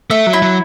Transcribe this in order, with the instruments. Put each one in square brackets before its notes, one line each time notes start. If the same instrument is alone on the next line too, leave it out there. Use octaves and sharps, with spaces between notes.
[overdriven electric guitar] A3 [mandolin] E5
[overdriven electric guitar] F#3
[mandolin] E4
[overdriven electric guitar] F#3